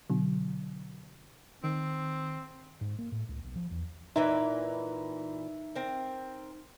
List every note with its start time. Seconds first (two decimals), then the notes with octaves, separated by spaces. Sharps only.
0.10 B2 D3 F#3
1.64 D#3 C4
2.81 G#2
2.99 A#3
3.12 A2
3.29 C#2
3.44 B1
3.55 F3
3.71 E2
4.16 A#2 E3 D#4 B4 E5 A#5
5.75 C4 A#4